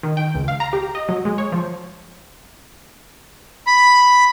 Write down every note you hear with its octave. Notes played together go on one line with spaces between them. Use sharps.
D#3
G5
C#2
F5
A#5
G4
D#5
F#3
G#3
C#5
F3
B5